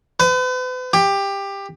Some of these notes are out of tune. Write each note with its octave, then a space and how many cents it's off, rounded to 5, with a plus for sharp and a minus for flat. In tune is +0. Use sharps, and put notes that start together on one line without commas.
B4 +40
G4 +15